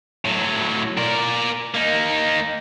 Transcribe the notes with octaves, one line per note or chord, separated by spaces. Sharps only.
A2 F#3
A#4 D5
A#3 D#4